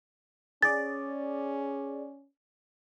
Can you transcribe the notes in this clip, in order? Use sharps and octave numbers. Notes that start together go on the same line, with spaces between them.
C#4 G#4 D5 A6